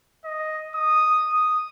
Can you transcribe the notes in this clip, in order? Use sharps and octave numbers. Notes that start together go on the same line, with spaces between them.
D#5
D#6
D#6